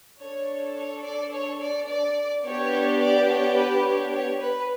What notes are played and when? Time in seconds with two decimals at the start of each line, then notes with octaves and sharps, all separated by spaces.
0.20 D4 A4 C#5
0.76 C#5
1.03 D5
1.33 C#5
1.60 D5
1.88 D5
2.44 B3 D4 G4 C#5
3.00 D5
3.29 C#5
3.57 B4
3.85 C#5
4.12 C#5
4.40 B4